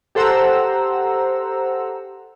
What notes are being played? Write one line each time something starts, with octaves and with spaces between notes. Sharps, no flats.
G4 A4 C5 F#5 A#5 E6